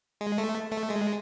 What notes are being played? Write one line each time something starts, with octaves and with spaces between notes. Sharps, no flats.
G#3
A3
A3
G#3